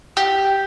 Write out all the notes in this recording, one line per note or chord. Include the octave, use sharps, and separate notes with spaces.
G4